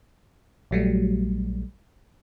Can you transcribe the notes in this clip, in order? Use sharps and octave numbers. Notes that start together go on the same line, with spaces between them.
A#1 F#3 G3 A3